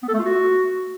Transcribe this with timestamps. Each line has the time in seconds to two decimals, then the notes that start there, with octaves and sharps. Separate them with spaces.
0.03 B3
0.08 A4
0.14 A3
0.19 F4
0.25 F#4